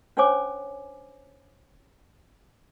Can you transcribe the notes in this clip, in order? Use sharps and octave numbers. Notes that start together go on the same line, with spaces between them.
C#4 D4 C5 C#5 G#5 D6